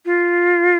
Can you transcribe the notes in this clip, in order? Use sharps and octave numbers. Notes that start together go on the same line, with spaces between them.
F4